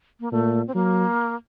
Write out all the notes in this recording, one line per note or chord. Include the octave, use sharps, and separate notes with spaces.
A#3
A#2 A3
C4
F#3 A#3